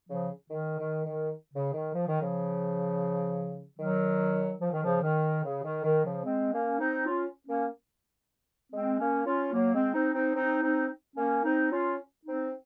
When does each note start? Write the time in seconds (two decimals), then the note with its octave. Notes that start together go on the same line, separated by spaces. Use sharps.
0.10 C#3 F3
0.50 D#3
0.79 D#3
1.06 D#3
1.54 C#3
1.74 D#3
1.94 F3
2.08 D#3
2.20 C#3 F3
3.79 D#3 F#3
4.60 F3
4.72 D#3
4.83 C#3 F3
5.02 D#3
5.43 C#3
5.63 D#3
5.84 D#3
6.05 C#3 F3
6.25 G#3 C4
6.53 A#3 C#4
6.79 C4 D#4
7.06 C#4 F4
7.47 A#3 C#4
8.71 G#3 C4
8.98 A#3 C#4
9.25 C#4 F4
9.53 F#3 A#3
9.73 G#3 C4
9.94 C4 D#4
10.14 C4 D#4
10.35 C4 D#4
10.62 C4 D#4
11.16 A#3 C#4
11.44 C4 D#4
11.71 C#4 F4
12.26 C4 D#4